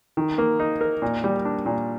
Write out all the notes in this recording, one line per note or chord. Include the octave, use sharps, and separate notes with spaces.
D#3
A#3
D#4
A#4
A#2
G3
D4
A#2